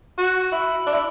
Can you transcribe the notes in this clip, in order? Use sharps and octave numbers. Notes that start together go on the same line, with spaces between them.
F#4
E4
D4
E4